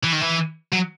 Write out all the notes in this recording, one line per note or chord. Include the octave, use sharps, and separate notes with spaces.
E3
D#3
E3
F#3